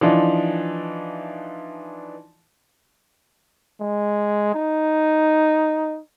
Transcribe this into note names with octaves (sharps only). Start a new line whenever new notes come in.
E3 F3 D4 D#4
G#3
D#4